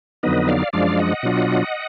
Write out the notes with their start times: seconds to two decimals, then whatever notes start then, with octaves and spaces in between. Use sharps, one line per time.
0.23 F2 D3 F#3 B3 D#4 B4 D#5
0.48 D5 F5
0.73 F#2 F3 G#3 D4 D5 F5
0.99 D#5 F#5
1.23 B2 F#3 D4 F4